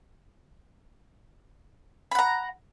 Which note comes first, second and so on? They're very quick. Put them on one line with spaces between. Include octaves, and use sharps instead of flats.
B5 F#5 A#5